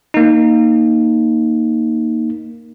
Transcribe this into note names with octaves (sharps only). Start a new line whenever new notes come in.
A#3 D#4